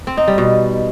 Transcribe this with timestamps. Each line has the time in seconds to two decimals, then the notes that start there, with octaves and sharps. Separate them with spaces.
0.07 C4
0.17 D#4
0.28 G3
0.38 B2